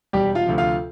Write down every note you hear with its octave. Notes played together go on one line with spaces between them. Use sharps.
E1 G3 G4
F4 F5
D2 C3 F3
F4 F5